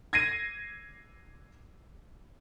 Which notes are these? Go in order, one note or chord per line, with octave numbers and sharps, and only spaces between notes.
G#6 A#6 C7 D#7